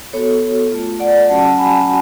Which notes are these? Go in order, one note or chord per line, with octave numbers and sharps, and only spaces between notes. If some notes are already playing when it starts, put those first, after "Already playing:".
B3 F#4 A4 C#5
A3 F4
D5 F#5
F#3 C#4 F#4 F#5 A5
G#5 B5